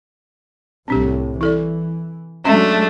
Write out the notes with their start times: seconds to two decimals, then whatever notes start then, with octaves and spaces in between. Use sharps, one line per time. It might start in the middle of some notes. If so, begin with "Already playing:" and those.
0.88 C2 A2 C4 D4 G4
1.41 E3 E4 A4 D5
2.45 F#3 G#3 A3 C#4 D4